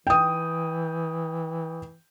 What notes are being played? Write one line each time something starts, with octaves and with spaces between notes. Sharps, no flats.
E3 G5 D#6